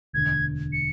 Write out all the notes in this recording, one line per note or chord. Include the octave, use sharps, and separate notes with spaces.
E1 D2 D3 G#6
C#7